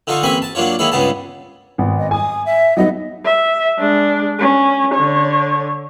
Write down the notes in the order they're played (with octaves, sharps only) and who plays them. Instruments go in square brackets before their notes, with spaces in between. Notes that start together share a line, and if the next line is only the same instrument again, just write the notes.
[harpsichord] D3 D#4 F4 A4 C#6
A1 A#3 C4 G#5 B5 C#6
A5
F#3 A#3 D4 F4 C#5
D#3 G#3 A#3 E4 C#5
C#2 G2 C#3 B3 G#4 A5
[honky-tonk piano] G#1 B3
[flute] D#5
[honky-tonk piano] G#5 [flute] D#6
[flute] E5
[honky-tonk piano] F#3 B3 D#4 [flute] D#5
[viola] E5
G#3 D4
C#4
D3 C#5